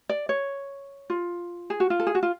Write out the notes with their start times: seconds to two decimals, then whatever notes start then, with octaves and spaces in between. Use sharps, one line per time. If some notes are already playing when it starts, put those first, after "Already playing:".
0.09 D5
0.29 C#5
1.10 F4
1.70 G#4
1.80 F#4
1.90 F4
1.99 A4
2.07 G#4
2.15 F#4
2.23 F4